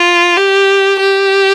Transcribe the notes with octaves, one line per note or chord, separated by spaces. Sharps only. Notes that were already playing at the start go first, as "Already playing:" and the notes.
Already playing: F4
G4
G4